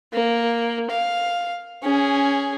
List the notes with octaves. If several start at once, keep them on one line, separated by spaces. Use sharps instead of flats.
A#3
F5
C#4 G#4